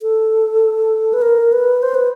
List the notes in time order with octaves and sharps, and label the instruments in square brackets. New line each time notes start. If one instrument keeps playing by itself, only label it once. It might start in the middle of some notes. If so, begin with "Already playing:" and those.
[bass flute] A4
B4
A#4
B4
C5
B4